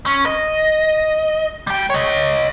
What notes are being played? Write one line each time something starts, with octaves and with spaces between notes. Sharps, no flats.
C#4
D#5
G3 G5
C#5 D#5